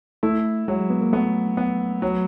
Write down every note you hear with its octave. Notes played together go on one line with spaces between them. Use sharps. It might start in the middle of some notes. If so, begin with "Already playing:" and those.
A3 E4
F#3 G#3
B3
A#3
A3 B3
B3
F#3